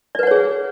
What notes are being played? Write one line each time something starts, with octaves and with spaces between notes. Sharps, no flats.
G#4 B4 C#5 D5 F#5